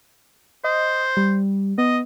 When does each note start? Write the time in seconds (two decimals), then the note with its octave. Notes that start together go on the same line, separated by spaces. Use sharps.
0.64 C5 D#5
1.17 G3
1.78 B3 D#5